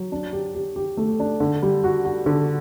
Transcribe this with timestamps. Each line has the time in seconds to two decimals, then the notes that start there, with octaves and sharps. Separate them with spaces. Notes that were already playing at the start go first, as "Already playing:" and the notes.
Already playing: F#3
0.12 D4
0.33 G4
0.55 G4
0.76 G4
0.97 A3
1.20 D4
1.40 D3
1.63 G3
1.84 F#4
2.05 F#4
2.26 D3